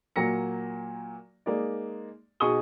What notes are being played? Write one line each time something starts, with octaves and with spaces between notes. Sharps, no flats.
A#2 F#3 A#3 A#6 C#7
G#3 A#3 D#4 D5
B2 D#4 G#4 C#6 D#6 G7